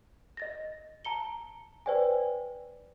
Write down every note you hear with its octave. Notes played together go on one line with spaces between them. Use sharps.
D#5 A6 A#6
A5 A#5 C#7 G7
B4 C5 D5 G5 G#5